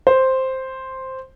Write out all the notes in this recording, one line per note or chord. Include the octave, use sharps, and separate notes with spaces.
C5